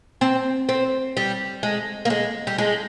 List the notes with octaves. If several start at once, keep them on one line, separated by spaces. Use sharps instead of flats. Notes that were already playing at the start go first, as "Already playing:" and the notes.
C4
C4
G3
G#3
A#3
G#3
G3
G#3